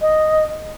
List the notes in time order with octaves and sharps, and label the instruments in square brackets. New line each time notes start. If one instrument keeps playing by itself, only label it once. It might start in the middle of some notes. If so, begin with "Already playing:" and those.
[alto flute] D#5